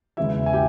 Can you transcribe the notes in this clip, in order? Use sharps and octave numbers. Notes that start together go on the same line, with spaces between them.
E2 C#3 G#3 E4 E5
G#5
G4 G5